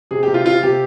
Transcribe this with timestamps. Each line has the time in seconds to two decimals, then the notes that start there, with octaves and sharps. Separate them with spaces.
0.11 C3 G#4
0.23 G4
0.28 C3
0.34 F4
0.45 C3 F4
0.63 C3 G4